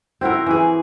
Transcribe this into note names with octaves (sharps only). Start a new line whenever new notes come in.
C4 E4 F#4 A#4
E3 G#4